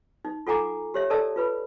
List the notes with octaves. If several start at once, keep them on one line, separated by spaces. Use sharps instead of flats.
D#4
F4 A4 F#5 G#5 A#5 D6
G4 C#5 E5
A4 A#4 D5 A5 E6
F4 B4 B5